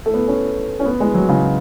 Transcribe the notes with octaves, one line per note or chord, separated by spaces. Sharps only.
A3
B3
C#4
C#4
B3
G#3
F#3
C#3